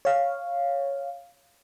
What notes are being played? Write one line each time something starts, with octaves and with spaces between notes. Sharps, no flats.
C#5 F5